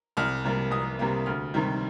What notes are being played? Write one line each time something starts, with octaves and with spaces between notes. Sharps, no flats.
C2 F6
C3 G3 A#3
C2 D#6
C3 G3 A#3
D2 F6
C3 D#3 G3